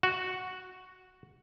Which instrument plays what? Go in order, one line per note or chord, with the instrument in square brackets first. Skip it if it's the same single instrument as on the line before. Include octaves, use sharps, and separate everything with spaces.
[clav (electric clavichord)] F#4